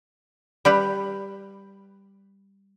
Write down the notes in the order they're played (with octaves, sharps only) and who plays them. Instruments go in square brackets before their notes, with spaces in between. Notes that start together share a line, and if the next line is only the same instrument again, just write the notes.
[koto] G3 G4 B4